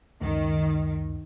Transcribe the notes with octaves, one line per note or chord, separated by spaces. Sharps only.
C#2 F#2 D#3